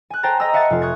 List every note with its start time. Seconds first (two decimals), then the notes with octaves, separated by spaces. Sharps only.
0.10 G#5 F#6
0.23 C5 G5 A5 A#5 A6
0.40 D#5 A#5 D#6 E6
0.53 E5 F#5 G#5 A5 A6 C#7
0.70 F1 F4
0.82 C#6 D#6 F#6 G#6